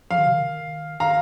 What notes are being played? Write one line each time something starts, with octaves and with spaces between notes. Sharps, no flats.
F3 F5
D#3
C3
D#3
D#3 F5 A#5